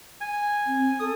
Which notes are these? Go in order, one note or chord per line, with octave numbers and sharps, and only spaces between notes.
G#5
C4
A4 D#6